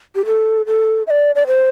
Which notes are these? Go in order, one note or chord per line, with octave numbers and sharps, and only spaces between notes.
G4
A4
A4
E5
D5
D5
C5